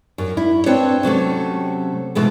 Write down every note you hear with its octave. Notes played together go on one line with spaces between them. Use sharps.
F#2
E4
C4 D4 B4 C#5
C3 F#3 A3 C#4
B2 E3 G#3 A3